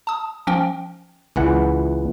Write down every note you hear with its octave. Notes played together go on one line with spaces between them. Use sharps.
A5 D#6
F3 C#4 G5
C#2 E3 F#5